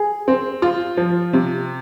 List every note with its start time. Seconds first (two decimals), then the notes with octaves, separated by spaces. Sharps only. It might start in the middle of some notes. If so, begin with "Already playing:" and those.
Already playing: G#4
0.28 C4
0.62 F4
0.97 F3
1.33 C3